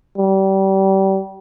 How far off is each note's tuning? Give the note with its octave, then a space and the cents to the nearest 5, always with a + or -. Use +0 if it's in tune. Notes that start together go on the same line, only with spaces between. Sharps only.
G3 -30